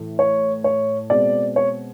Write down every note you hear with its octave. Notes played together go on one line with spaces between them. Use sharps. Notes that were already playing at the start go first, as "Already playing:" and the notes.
Already playing: A2 E3 A3
C#5
C#5
B2 G#3 C4 D5
C#5